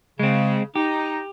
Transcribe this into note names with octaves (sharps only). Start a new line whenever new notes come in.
C#3 G#3 C4
D#4 G4